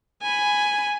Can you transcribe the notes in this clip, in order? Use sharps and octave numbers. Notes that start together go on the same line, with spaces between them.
G#5 B5